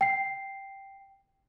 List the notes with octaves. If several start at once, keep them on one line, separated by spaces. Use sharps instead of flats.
G5 C7